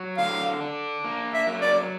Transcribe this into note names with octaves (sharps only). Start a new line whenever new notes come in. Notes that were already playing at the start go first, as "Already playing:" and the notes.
Already playing: F#3
D3 F5
D4
A#3
E5
F#3
D5